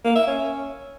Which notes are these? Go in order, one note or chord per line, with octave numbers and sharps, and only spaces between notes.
A#3
E5
C#4